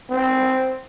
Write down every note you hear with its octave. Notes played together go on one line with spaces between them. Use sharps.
C4